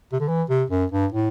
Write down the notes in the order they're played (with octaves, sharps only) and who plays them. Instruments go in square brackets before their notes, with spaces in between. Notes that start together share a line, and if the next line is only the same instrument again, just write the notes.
[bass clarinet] C3
D3
E3
C3
F#2
G2
A2